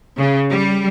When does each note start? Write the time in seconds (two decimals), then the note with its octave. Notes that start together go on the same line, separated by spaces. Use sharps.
0.18 C#3
0.50 G3